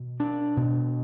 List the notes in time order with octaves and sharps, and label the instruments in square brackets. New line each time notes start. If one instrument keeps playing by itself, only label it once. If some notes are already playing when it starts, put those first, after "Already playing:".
Already playing: [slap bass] B2
D4
B2